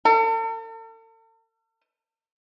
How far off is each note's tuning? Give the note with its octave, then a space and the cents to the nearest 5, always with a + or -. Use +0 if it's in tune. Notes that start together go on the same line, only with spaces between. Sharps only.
A4 +45